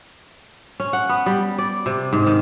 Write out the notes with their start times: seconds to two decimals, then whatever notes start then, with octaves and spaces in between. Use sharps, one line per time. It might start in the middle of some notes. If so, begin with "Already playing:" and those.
0.80 C#4
0.93 F#5
1.09 B3
1.26 G3
1.58 D5
1.86 C3
2.13 G#2
2.27 D#3